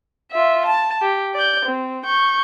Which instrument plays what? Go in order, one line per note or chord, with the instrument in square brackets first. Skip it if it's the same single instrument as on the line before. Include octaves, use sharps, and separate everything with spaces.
[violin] F4 E5
A5
G4
D5 G6
C4
C#6 G6